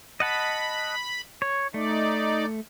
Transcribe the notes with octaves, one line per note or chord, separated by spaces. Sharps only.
D#5 F#5 A5 B5
C#5
A3 D#4 D5